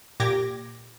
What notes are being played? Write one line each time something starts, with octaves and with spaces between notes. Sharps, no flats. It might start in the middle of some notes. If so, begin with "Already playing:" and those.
A#2 G4 D6 G#6 A#6